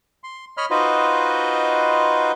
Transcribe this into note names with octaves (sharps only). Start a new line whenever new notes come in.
C6
C#5 D#5 B5 F6
D#4 F4 F#4 B4 C5 D#5